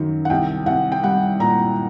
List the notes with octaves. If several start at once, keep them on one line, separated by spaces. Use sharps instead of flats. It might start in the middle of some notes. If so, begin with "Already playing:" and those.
Already playing: F#2 D#3 F#3
F#5
C2 G5
C2 F#5
G5
G3 F#5
A#2 A#5